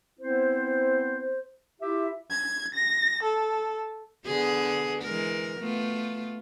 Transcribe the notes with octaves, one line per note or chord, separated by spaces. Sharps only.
B3 C4 E4 C5
E4 F4 G4 E5
G#6
A#6
A4
D3 B3 G#4
E3 G#3 A#4
A3 B3 F4